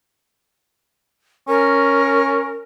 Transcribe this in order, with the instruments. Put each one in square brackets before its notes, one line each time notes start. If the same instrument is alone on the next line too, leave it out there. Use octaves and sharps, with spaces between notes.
[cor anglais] C#4 [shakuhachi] A#4